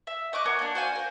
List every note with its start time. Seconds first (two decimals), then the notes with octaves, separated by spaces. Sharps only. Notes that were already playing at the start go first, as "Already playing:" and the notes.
0.07 E5
0.33 D#5 C#6 D6 F#6
0.45 B3 C#4 F#4 A#4
0.59 A#3 D4
0.75 F#4 C5 F5 G#5
0.95 A#4 C5